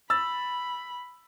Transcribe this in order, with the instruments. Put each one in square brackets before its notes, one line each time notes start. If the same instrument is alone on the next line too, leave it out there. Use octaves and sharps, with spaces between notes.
[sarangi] B5 [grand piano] E6 A6